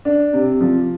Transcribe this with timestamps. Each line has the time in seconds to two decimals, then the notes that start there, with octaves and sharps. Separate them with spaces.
0.05 D4
0.33 C3
0.61 F3